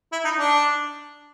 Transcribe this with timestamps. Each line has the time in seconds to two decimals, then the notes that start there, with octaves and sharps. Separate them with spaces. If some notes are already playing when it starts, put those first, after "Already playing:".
0.12 E4
0.24 D#4
0.38 D4